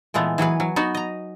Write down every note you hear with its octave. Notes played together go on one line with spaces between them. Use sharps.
A#2 E3 G#3 A3 B3
E3 F#3 G#4 B4
F#3
B3 D#4 F#4
D#5 A#5